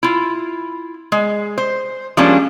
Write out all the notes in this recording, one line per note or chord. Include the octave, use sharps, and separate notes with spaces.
E4 F4
G#3
C5
F3 G3 G#3 A#3 C#4 D4